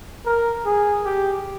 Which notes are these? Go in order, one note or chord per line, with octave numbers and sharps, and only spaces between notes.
A#4
G#4
G4